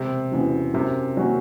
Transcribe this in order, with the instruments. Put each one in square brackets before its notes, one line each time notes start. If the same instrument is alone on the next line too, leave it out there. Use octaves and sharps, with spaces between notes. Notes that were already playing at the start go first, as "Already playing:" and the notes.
Already playing: [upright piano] E1 [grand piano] C3
[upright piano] E2 C#3 F#3
[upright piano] F#2 [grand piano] C3
[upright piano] D#3 F#3 C#4